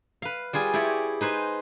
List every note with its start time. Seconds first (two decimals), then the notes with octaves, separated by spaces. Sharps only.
0.22 B4 F5
0.53 G3 F4 G#4 G#5
0.74 E4 G4 G#4 C#5 D5
1.21 D#4 B4 C5 G#5